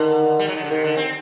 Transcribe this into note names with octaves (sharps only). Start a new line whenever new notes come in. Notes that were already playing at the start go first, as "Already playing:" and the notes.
Already playing: D3 D#3
G3
F#3
D#3
D3
C3 D#3
D3
C4